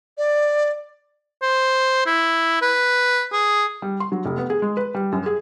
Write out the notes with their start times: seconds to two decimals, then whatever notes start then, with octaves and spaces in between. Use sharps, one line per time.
0.18 D5
1.42 C5
2.06 E4
2.62 B4
3.33 G#4
3.82 G3
4.00 C6
4.12 F#3
4.25 F1
4.37 B3
4.50 G#4
4.62 G#3
4.77 B4
4.94 G3
5.12 F#2
5.26 G#4